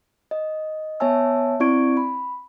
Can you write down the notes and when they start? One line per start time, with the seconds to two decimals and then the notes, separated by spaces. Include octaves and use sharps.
0.31 D#5
1.00 B3 C#5 E5 G#5 A5 E6
1.60 C4 E4 D5 C#6 G#6 D7
1.97 B5